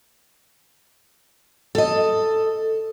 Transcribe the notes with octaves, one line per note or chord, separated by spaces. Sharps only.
A4 D#5